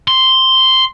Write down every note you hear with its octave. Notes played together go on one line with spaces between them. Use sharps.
C6